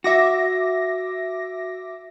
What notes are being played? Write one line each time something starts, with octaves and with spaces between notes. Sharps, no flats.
F#4 E5 D6 A#6